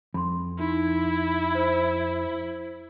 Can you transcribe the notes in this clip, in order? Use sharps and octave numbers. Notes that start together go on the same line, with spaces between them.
F2 B5 C6
D#4 E4
C5